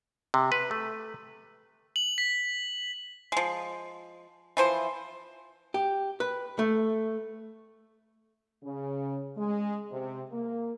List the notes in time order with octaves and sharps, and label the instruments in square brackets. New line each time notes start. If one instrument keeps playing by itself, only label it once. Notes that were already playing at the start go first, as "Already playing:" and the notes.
[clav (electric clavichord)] C3
B4
A3
[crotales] F#7
B6
[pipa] F3 G#3
E3 F3 C5
[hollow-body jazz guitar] G4
B4
A3
[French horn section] C#3
G#3
C3
A#3